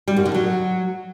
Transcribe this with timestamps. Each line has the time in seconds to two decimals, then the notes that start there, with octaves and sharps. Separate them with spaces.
0.08 G3
0.16 F#2
0.25 D3
0.34 F#3